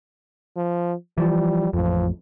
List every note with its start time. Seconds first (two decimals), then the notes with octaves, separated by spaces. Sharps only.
0.56 F3
1.18 E3 F3 G3
1.73 A1 F2 F3